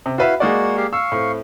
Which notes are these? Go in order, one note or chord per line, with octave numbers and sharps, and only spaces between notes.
C3
E4 F#4 B4 E5 F5
G#3 A#3 F#4 D5 F#5
G4 F5
F5 C#6 E6
A2 C4